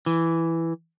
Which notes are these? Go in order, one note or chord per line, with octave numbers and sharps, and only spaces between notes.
E3